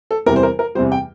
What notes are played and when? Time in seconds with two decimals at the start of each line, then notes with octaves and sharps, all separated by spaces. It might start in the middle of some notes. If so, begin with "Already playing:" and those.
0.11 A4
0.26 E2 C3 E3 G3 A#4
0.36 C5
0.43 A#4
0.59 A#4
0.75 E2 C3 E3 G3 C5
0.92 G5